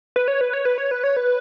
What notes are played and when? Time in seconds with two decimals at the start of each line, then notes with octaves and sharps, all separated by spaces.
0.16 B4
0.28 C#5
0.41 B4
0.53 C#5
0.65 B4
0.78 C#5
0.91 B4
1.04 C#5
1.16 B4